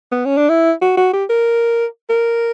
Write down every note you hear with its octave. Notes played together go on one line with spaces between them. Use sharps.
B3
C#4
D4
E4
F#4
F#4
G4
A#4
A#4